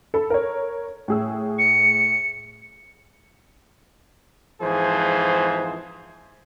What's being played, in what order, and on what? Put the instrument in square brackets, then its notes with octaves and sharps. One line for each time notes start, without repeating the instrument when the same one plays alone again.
[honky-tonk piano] A4 B5
A#4 C#5
A2 G#4 E6
[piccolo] C#7
[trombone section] F2 G#2 E3 F3 G#4 C5